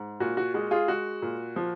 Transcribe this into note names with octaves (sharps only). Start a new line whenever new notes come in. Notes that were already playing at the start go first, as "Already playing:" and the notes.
Already playing: G#2
A#2 F#4
F#4
G#3 F#4
F4 G#4
G#3 F#4
A#2
F3